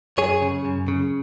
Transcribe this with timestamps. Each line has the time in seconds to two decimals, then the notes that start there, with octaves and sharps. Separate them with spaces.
0.18 F#2 G#4 C#5
0.42 C#3
0.65 F#2
0.88 C#3